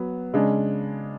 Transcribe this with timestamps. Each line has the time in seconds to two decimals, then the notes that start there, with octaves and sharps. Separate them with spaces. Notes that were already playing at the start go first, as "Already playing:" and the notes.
Already playing: F#3 B3
0.34 C#3 G#3 D4